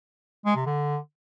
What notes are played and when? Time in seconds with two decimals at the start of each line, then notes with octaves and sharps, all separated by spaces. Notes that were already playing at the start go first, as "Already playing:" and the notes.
0.46 G#3
0.56 C3
0.66 D3